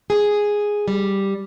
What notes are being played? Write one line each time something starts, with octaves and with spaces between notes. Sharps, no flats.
G#4
G3